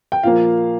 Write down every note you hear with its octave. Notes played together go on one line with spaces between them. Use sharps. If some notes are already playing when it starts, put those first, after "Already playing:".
G5
A#2 F3 A#3 F5